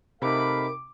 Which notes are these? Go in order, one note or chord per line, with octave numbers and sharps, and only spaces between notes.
C3 A3 D#4 A#4 F5 B5 D6